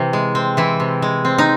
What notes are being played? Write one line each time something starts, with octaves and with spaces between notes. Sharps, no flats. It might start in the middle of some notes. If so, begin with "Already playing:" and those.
Already playing: C3 E3 C4
G#3
C4
E3 E4
C3
G#3
C4
D#4